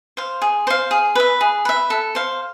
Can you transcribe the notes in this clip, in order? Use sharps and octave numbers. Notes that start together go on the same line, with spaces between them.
C5 F5
G#4
C5 F5
G#4
B4 E5
G#4
B4 E5
A4
C5 F5